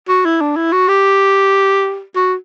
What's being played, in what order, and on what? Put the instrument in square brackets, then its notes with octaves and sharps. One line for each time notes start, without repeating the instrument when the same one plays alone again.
[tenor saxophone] F#4
E4
D4
E4
F#4
G4
F#4